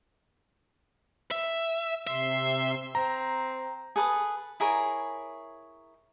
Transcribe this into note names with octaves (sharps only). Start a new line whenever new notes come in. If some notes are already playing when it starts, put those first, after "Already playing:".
E5
C3 E5 C6
C4 A#5
G#4 A4 B4 D#6
E4 G#4 A#4 C#5